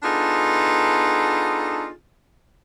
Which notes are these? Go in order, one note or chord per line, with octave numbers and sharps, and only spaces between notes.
B3 D4 D#4 F4 G#4 A4